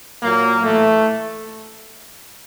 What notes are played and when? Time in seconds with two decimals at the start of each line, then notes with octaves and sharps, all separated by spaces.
0.23 A#2 F#3 A#3
0.65 A2 E3 A3